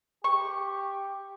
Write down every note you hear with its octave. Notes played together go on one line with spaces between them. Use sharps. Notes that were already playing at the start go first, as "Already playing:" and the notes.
G4 C#6